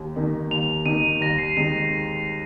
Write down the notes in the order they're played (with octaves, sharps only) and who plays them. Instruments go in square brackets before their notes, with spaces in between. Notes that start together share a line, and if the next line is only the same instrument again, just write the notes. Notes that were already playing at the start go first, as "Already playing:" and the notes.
Already playing: [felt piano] D#2
D#3 A#3 D#4
[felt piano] D#2 [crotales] F7
[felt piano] D#3 A#3 D#4 [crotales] D#7
[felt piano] D#2 [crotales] A#6
[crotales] C7
[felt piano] D#3 G#3 C4 D#4 [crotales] D#7